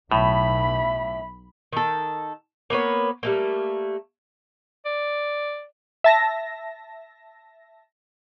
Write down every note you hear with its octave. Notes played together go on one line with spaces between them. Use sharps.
B1 A2 E5 B5
D#3 A4
A#3 B3 B4 C#5
G3 A3 A#3
D5
E5 A5 A#6